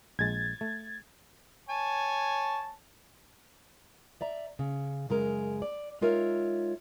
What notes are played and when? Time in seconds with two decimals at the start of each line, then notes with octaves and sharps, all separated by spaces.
0.19 A#1 G#3 G#6 A6
0.61 A3
1.69 C#5 G#5 A5
4.21 D5 E5 A#5
4.59 C#3
5.09 F#2 C#3 G#3 A#4
5.62 D5
6.01 G#3 D#4 F4 A#4 C#5 E5